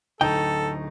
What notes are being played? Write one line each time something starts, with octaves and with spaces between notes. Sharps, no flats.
D1 D2 D#4 A4 G5